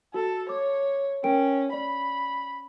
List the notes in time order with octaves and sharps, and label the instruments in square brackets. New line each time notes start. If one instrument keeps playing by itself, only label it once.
[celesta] F#4 [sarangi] A4
[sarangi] C#5 [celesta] D6
[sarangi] C#4 [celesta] A#4 G5 D7
[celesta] D5 [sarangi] B5